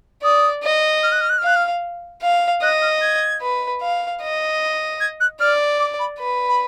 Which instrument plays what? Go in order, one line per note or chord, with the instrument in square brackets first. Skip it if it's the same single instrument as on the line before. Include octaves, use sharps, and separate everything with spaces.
[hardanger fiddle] D5 [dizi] D#6
[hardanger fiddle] D#5
[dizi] F6
F#6
F6
F#6
F6
[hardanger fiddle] F5 [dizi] F#6
[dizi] F6
[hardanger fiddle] F5
[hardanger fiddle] D#5 [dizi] F#6
[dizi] F6
G#6
[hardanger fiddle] B4
F5
D#5
[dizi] G#6
F#6
[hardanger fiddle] D5 [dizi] F6
[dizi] D6
B5
[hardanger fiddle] B4
[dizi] B5